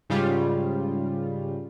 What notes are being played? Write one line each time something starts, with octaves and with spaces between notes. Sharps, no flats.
G#2 C#3 G3 F4